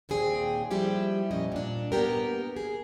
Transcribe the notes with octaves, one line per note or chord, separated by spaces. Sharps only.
D#2 A#2 C4 G#4 G5
F3 G3 E4 G4
F2 A#2 C#4 G4 D#5
A#2 D4
A#3 B3 G4 A#4
G#4